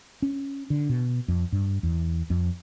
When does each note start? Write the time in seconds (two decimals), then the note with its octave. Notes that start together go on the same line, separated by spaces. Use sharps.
0.22 C#4
0.70 D3
0.89 B2
1.28 F2
1.52 G2
1.83 E2
2.30 F2